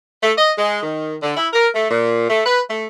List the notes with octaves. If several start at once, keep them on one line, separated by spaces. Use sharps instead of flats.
A3
D#5
G#3
D#3
D3
E4
A#4
A3
A#2
A3
B4
A3